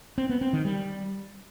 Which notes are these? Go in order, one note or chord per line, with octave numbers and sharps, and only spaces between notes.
C4
B3
C4
D#3
G3